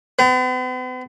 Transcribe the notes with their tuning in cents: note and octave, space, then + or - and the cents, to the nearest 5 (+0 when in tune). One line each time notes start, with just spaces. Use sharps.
B3 +45